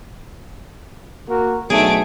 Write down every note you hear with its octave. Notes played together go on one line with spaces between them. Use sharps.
A#3 F#4 A#4
B1 F#3 A3 D4 D#4 G#4 D7